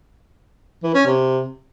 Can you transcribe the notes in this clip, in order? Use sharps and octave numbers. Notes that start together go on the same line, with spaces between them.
E3
C#4
C3